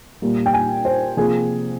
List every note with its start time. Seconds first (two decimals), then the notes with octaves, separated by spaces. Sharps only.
0.22 A#2 G3 A#3
0.46 G5
0.53 G#5
0.85 C5
1.16 C3 F3 A#3 G#4